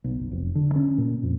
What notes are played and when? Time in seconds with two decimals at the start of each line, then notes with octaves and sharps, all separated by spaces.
0.04 B1
0.20 F#1
0.32 F1
0.55 D3
0.76 C#4
0.98 A#2
1.23 F2